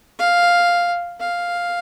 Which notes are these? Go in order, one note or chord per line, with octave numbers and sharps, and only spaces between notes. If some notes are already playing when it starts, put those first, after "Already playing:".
F5
F5